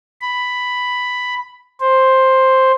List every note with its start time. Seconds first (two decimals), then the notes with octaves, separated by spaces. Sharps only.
0.22 B5
1.81 C5